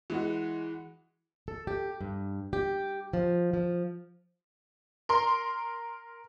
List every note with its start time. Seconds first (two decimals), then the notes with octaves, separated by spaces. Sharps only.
0.10 E3 G#3 F#4
1.48 A4
1.67 G4
2.01 G2
2.53 G4
3.13 F3
3.53 F3
5.09 A#4 C6